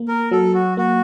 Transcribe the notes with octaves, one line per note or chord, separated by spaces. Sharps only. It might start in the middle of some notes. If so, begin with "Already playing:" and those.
Already playing: A#3
A#4
F#3 A4
F#4
A#3 F#4